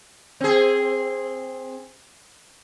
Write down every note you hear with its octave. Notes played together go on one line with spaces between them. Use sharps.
C4 G#4